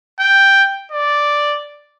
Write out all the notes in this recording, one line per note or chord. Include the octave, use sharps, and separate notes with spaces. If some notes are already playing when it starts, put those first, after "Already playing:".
G5
D5